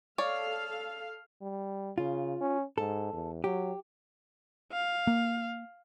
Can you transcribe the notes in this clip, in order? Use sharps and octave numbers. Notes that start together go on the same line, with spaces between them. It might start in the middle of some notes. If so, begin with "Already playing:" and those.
A4 C#5 D5 F5
G3
C#3 F4
C#4
G#2 A4
E2
F#3 G4
F5
A#3